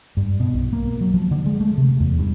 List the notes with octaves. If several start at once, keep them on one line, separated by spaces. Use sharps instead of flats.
G2
B2
B1
A#3
F#3
F3
D3
G#3
A3
C3
E2
G2